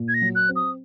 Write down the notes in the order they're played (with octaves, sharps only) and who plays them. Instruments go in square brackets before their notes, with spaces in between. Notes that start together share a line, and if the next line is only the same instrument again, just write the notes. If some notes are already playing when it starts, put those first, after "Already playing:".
Already playing: [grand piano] A#2
[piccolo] G#6
A#6
[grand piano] F#3
[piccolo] F#6
[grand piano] C4
[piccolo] D#6